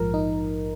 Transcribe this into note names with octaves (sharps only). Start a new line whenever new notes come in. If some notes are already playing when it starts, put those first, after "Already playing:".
Already playing: A#1 G#2 F3 A#4
D#4